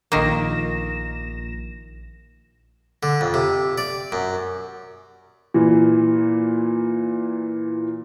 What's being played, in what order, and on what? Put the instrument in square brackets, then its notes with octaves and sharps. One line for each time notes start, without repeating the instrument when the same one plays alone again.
[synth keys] A#1 A#6 E7 [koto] D#3 A#3
[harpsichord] D3
F2
C3
D5
F#2
[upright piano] A#2 E3